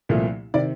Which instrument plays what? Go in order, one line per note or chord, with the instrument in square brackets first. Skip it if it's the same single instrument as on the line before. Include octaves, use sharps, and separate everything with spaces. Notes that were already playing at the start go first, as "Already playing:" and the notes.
[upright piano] C2 A#2 F3 A3
C3 D#3 D5